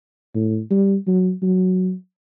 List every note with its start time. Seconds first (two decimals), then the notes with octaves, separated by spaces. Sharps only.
0.35 A2
0.71 G3
1.07 F#3
1.42 F#3